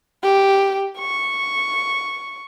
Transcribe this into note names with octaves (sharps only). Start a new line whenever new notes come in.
G4
C#6